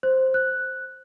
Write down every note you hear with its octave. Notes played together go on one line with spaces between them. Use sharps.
C5
F#6